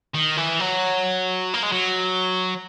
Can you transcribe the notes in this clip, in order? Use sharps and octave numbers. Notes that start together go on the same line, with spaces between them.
D#3
E3
F#3
A#3
G#3
F#3